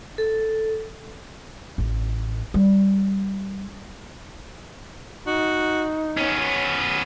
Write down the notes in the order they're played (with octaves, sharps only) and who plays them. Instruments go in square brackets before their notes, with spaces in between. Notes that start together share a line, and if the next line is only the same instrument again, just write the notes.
[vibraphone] A4
[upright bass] A1
G3
[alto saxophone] D#4 [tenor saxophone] F#4
[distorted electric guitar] B3 C#4 [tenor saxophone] C#5